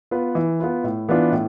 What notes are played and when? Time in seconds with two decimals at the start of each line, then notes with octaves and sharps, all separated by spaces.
0.11 B3 F4 B4
0.35 E3
0.60 B3 F4 B4
0.84 A2
1.09 E3 B3 D4 F4
1.32 A2